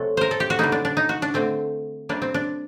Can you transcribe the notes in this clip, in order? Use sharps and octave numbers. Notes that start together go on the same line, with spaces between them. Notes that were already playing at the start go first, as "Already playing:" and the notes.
Already playing: C3 F#3 A3 A4
A#4 C5
A4
G4
F#4
D3 G3 A#3 D#4
D4
D4
D#4
F#4
D4
D3 A3 C4
C3 G3 A#3 D4
C4
D4